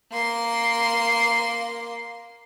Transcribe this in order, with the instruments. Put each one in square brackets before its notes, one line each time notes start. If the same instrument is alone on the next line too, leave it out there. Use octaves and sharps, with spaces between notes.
[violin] A#3 C6